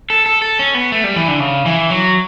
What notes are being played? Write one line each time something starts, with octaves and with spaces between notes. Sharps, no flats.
A4
A4
A4
C#4
B3
A3
G3
E3
D3
C#3
E3
F#3